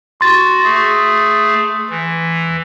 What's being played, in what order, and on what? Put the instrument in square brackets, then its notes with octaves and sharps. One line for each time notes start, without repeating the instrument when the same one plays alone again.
[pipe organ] F#4 [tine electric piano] C6 A6
[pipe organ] A3 G#4
E3